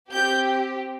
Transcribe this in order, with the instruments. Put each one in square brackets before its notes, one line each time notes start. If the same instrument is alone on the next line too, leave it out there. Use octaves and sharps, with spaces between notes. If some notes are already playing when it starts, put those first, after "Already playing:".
[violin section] C4 G4 G6